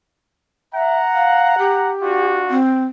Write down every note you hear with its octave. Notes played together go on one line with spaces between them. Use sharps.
E5 F#5 A#5
F5
G4
D4 F4 F#4
C4